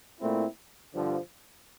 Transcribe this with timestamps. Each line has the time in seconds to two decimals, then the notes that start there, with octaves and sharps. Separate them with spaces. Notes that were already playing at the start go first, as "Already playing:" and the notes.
0.19 A#2 A3 C4 E4
0.93 G2 D3 F3